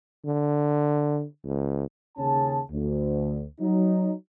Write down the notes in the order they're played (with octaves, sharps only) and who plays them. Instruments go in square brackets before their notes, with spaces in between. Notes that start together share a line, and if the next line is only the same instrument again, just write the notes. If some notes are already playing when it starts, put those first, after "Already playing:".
[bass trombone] D3
C#2
[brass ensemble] D#2 C#3 C#4 G#4 A5
D2
F#3 D#4